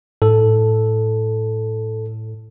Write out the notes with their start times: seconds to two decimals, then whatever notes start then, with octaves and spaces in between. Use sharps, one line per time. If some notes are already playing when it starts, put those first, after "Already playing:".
0.22 A2 A4